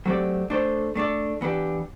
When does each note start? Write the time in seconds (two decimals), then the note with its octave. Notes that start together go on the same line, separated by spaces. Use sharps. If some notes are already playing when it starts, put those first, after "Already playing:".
0.06 F#3 A3 C4 G4 D5
0.50 A3 D4 A4 C5
0.95 A3 D4 A4 D5
1.41 E3 B3 D4 G4